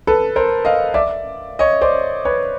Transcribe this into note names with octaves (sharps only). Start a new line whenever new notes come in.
A4 B4
A#4 C5
D#5 F5
D5 E5
C#5 D#5
C5 D5
B4 C#5